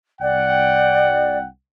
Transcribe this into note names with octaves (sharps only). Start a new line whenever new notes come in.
C2 D5 F#5 G5